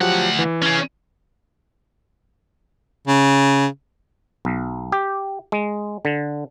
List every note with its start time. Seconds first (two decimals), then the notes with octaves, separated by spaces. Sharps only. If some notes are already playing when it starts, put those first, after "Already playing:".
0.01 D2 F3 F#3 G4 F#5
0.39 E3
0.62 C#4 G#4
3.07 C#3
4.45 B1
4.92 G4
5.52 G#3
6.05 D3